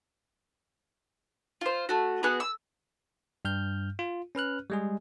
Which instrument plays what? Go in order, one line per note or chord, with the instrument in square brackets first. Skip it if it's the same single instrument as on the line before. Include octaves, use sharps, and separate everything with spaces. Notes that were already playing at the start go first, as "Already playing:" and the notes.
[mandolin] F4 C5
A3 F#4
B3 F#4 G#4 F#6
E6
[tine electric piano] G2 F6 G6
F4
C#4 B4 F6 F#6
G3 G#3 G#4